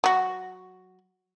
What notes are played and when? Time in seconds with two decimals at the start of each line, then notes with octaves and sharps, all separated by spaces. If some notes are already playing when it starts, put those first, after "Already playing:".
0.04 F#3 F#4